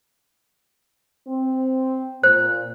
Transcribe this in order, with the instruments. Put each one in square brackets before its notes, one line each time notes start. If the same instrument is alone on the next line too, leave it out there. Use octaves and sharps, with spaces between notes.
[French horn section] C4
[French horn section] A#2 [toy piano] C5